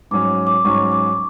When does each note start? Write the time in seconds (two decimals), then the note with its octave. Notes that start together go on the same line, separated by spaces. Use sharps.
0.11 G#2 F#3 C#4 D6
0.47 D6
0.65 G#2 F#3 C#4 C#6
0.92 D6